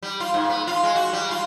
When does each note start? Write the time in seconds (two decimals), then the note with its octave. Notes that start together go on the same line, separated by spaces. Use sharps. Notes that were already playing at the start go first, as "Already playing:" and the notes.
0.02 G3
0.20 F4
0.34 G#2
0.50 B3
0.67 F4
0.83 G#3
0.96 F#4
1.13 G3
1.31 F4